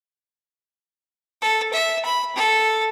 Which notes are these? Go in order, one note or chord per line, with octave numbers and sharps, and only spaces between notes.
A4
E5
B5
A4